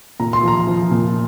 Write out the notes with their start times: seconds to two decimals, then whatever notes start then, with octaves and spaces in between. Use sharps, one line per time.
0.20 A#2 A#5
0.33 C6
0.43 F3 A#5
0.67 F3
0.91 A#2